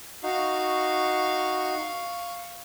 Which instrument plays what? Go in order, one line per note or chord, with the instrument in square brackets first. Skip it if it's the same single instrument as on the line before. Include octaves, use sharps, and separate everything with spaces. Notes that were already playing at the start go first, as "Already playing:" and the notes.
[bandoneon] D#4 F#4 [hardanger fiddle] F5 C#6